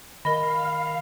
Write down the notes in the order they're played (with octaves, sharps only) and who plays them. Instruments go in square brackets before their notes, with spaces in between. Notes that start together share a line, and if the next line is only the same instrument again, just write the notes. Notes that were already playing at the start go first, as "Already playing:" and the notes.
[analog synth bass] D#3 [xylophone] A#4 D#5 A#6 [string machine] F5 [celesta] B5